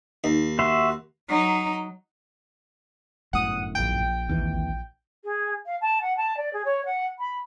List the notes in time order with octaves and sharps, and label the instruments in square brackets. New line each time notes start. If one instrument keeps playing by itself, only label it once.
[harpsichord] D#2 [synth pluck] D#4
[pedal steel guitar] F#4 E5 C6
[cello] F#3 D#4
[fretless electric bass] G1 F#2 A2 [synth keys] F#5 D#6
[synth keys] A#1 G5
[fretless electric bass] G#1 D#2 E3
[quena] G#4
F5
A5
F#5
A5
D5
G#4
C#5
F#5
B5